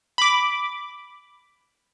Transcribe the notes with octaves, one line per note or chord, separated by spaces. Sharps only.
B5 D6